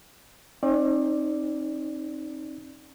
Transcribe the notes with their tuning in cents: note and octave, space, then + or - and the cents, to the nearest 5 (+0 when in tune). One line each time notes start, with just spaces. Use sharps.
C4 +45 D#4 +5 D5 +0